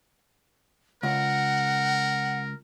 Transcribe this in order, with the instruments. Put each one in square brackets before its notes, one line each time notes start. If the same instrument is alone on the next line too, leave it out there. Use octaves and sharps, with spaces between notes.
[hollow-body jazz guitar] C#2 [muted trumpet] A#4 [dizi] F#5